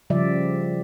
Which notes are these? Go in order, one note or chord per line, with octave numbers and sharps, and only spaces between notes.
C#3 F3 G3 D5 E5